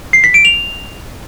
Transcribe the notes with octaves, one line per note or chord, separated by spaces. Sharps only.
C7
B6
D7
F7